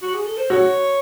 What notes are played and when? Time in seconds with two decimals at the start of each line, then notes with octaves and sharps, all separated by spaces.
0.02 F#4
0.14 G#4
0.26 A4
0.38 C5
0.50 F#4 C#5